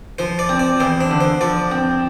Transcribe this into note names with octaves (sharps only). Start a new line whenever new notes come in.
F3 C5
D5
C4
D5
E2 C5
D4
D3
C5
F3 D5
C4